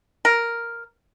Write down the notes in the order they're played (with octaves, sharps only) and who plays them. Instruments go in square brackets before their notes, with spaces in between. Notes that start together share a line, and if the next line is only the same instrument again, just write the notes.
[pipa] A#4